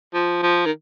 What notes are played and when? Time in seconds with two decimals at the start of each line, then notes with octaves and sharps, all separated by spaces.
0.14 F3
0.43 F3
0.66 D#3